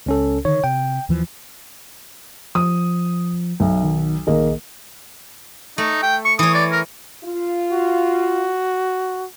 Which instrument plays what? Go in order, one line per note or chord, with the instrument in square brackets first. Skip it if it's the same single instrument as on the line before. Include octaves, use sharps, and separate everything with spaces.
[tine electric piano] C#2 C#4 A4
[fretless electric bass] D3 D#3 [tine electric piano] C#5
[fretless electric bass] C3 [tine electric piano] G5
[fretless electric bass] D#2 E3 F3
[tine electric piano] F3 [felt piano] D#6
[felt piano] B1 [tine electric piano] F#3 E5
[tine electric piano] D#3
[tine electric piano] A#1 G#4 D#5 [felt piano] D#3 A#3
[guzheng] A3 [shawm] D#4
[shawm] G5
C#6
[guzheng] E3 C#5 [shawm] D#6
[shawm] D5
A#4
[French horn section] F4
[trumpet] F#4